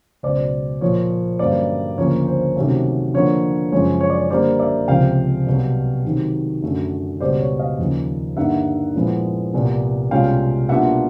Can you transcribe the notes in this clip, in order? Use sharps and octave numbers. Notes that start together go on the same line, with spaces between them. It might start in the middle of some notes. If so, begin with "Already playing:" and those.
C#2 B2 F#3 C5 D5
A#2 F3 A#3 C#5
G2 D3 F#3 A#3 C#4 C5 D5
D2 C#3 F3 A#3 C#4 C#5
C5
C3 D#3 F#3 A3 C#4
D3 F3 A#3 C#5
F#2 C#3 F3 G#3 C#4 C#5
C#5
D5
C#5
D3 G3 A#3 C5 D5
D5 E5
C#2 C3 F3 F5 G5
C2 B2 F#3
C3 D#3 F#3
F#2 D3 F#3 A3
C#2 B2 G3 C5 D5
C#5
D#5 F5
D#2 C#3 F3 A#3
G2 D3 G3 A#3 D#4 E5 F#5
A#2 F3 G#3 B3 E4
C2 A#2 G3 B3
C2 B2 G#3 C#4 F4 F5 G5
B2 G3 A#3 D4 F4 E5 F#5